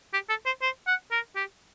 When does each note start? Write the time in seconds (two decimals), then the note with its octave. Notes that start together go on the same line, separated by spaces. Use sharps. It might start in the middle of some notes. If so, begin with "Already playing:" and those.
0.13 G4
0.29 A4
0.46 C5
0.62 C5
0.87 F#5
1.12 A#4
1.36 G4